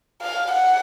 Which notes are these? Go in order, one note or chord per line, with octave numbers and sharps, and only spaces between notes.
F5
F#5